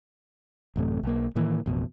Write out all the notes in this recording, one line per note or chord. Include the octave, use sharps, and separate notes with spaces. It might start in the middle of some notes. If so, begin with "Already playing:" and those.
A1 F#2 C3 A3
B1 A#3
A2 D#3 E3 A#3
A1 F2 B2